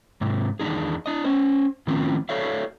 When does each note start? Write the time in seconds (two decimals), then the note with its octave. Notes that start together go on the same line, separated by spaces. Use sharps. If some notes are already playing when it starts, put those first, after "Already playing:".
0.21 G#2 C3 C4
0.60 E2 D#3 D4 D#4 G#4
1.06 D4 D#5
1.24 C#4 C5
1.87 A2 D#3 F3 C4 C#4 F4
2.29 F#4 A4 C#5 D5 E5 F5